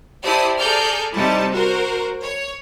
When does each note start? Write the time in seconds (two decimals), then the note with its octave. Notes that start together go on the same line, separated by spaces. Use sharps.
0.25 E4 G4 C5 D5 A5 D#6
0.58 G#4 A4 D5 A#5 F6 G6
1.16 C3 G3 D#4 E4 A5
1.53 F#4 A#4 C5
2.23 C#5